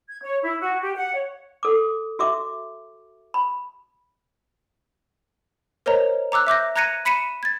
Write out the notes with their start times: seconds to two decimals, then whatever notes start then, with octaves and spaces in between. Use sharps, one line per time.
0.08 G#6
0.21 C#5
0.42 E4
0.59 F#4
0.80 G4
0.95 F#5
1.14 C#5
1.63 A4 D6
2.19 F#4 E5 D6
3.34 B5
5.86 A#4 C5 C#5 D#5 A#5
6.32 A#5 D6 E6 F#6
6.47 E5 D6 G6 A#6
6.76 A#5 F#6 G#6 A#6 C#7 D#7
7.05 B5 B6 C#7 D#7 E7
7.43 G#6 A6